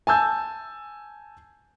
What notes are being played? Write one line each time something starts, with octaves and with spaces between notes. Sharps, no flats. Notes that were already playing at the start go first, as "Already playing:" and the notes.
G#5 A5 E6 G6